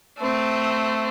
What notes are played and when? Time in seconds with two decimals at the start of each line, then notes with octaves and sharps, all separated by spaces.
0.19 A3 C4